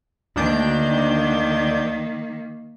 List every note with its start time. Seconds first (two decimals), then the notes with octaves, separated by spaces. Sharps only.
0.36 D2 D#3 A#3 D4 G6